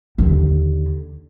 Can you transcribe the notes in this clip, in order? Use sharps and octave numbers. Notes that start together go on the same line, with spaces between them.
D#2 D3